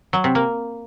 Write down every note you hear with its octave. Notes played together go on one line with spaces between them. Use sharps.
F#3
C3
A#3